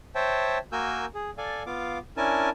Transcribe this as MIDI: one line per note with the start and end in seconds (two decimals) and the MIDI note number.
0.15 0.58 72
0.15 0.58 73
0.15 0.58 76
0.15 0.58 79
0.15 0.58 81
0.72 1.06 58
0.72 1.06 66
0.72 1.06 70
0.72 1.06 80
0.72 1.06 88
0.72 1.06 91
1.14 1.30 68
1.38 1.63 69
1.38 1.63 74
1.38 1.63 77
1.38 1.63 80
1.66 1.98 59
1.66 1.98 65
1.66 1.98 77
1.66 1.98 86
2.17 2.50 61
2.17 2.50 62
2.17 2.50 64
2.17 2.50 70
2.17 2.50 80
2.17 2.50 81